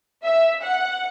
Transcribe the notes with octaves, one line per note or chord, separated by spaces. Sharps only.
E5
F#5